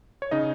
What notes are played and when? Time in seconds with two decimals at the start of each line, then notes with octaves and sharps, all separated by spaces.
0.22 C#5
0.31 C#3 D#4 D#5